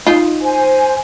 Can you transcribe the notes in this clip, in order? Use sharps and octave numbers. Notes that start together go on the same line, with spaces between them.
D#4 F4
C5 G#5